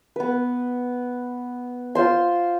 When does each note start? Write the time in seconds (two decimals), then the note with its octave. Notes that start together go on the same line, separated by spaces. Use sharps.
0.16 B3 B4
1.95 F4 C5 C6